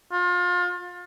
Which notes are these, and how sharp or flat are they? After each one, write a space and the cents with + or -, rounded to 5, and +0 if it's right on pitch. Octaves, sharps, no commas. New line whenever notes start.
F4 +30